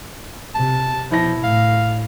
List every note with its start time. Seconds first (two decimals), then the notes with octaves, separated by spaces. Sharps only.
0.55 C3 A5
1.11 B2 F3 E4 A#6
1.44 A2 F5